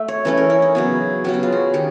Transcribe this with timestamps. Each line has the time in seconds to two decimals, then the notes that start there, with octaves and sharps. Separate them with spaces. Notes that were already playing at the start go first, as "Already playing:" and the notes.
Already playing: A3 E5
0.08 C#5
0.25 E3 A3 C#4 B4
0.37 A#4
0.50 E4
0.62 D#4
0.75 C#3 F#3 B3
1.24 C#3 F#3 B3 G4
1.34 F#4
1.43 F4
1.52 F#4
1.74 D#3 G4